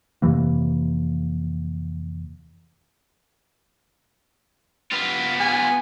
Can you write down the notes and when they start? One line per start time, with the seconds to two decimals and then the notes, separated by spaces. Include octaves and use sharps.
0.22 F2 C3 E3 A#3
4.91 B3 F4
5.40 G#5